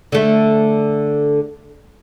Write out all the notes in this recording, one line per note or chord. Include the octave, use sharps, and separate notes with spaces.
D3 A3